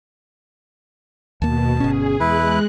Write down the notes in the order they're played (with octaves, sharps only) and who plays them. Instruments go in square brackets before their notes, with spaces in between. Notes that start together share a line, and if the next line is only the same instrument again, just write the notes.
[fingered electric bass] D#2 A#3 [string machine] B2 [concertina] A5
[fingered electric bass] G1 C#4 [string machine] G#4
[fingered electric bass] E2 [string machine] G#3 F#6 [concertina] E4 B4